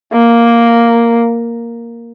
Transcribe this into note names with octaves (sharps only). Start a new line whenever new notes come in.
A#3